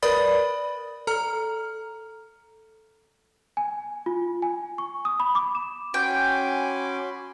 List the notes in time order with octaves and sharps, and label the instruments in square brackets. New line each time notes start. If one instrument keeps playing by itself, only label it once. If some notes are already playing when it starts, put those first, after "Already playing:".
[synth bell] A#4 B4 D5 B5 D#6 A6
A4 A#5 F6
[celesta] G#5
F4
G#5
C#6
D#6
B5
D6
E7
[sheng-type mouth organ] C#4 G#5 D6 [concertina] F#4 B5 C6 [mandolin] G5